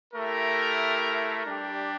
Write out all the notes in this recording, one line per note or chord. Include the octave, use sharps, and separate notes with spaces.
A3 E4 G4 A#4
G3 D4 G4